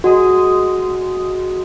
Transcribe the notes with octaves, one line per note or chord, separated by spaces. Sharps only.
G#3 F#4 G#4 D#5